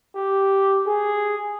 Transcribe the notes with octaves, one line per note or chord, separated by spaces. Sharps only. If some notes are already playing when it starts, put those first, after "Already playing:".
G4
G#4